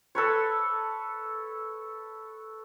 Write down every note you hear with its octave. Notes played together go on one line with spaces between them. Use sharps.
A4 B4 C#5